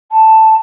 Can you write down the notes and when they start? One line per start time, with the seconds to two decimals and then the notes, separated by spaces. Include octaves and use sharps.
0.11 A5